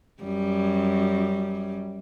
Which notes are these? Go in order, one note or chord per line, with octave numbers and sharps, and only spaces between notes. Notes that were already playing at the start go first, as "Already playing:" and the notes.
F#2 G3